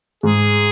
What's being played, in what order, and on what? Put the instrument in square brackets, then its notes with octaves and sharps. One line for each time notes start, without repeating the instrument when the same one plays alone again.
[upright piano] G#2 [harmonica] G#4